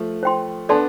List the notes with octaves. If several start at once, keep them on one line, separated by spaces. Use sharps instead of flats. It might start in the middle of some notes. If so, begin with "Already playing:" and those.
Already playing: F3 A3
C5 G5 C6
B3 D4 A4 D5 A5 C6